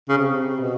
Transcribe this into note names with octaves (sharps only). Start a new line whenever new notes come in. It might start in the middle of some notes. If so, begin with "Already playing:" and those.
C#3
C3
B2